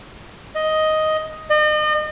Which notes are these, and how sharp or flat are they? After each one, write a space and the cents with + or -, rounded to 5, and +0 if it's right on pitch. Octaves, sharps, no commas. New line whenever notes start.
D#5 +5
D#5 -40